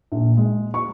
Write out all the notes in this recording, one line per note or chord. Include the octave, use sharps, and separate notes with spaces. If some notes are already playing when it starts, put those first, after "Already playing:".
A#1
G#3
C#6